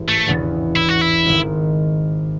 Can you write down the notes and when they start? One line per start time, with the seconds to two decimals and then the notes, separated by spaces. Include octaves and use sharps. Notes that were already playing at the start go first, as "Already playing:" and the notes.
Already playing: A1 G#2 E3
0.08 A3
0.26 E1 E2 C#3 E3
0.76 E4
0.89 F#4
1.01 E4
1.25 G#1 G#2 D#3